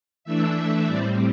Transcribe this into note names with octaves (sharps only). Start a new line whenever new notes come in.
E3 A3 D4 E5
A2 G3 C4 D5